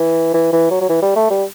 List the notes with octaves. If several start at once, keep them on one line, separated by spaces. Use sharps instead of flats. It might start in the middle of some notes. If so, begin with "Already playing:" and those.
Already playing: E3
E3
E3
F#3
F#3
E3
G3
A3
G3